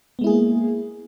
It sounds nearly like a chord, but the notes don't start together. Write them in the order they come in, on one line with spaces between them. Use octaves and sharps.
B3 G#3 E4 G#4 A#3